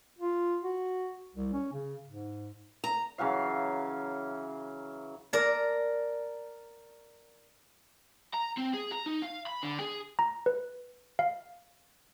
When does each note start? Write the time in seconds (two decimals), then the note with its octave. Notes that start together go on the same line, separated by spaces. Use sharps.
0.19 F4
0.64 F#4
1.35 C2
1.53 C#4
1.73 C#3
2.06 G#2
2.84 A#5
3.18 C#3 E3 F#3 F5
5.33 A#4 D5 A5
8.34 A#5
8.58 C4
8.74 G#4
8.92 A#5
9.06 D#4
9.22 F5
9.47 B5
9.63 D3
9.80 G#4
10.19 A#5
10.46 B4
11.19 F5